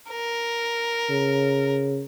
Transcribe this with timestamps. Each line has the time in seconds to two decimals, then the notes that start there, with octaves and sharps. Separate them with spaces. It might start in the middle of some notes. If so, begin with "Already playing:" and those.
0.11 A#4
1.10 C#3